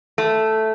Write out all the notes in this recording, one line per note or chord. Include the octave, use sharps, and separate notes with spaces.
A3